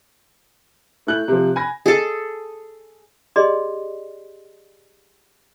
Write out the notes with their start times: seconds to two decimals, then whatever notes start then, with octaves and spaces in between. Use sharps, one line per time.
1.07 A3 E4 F#6 G6 F#7
1.28 C3 F3
1.56 G#5 B5 G#6 A#6
1.86 G#4 A4
3.36 G4 G#4 D5 D#5 C6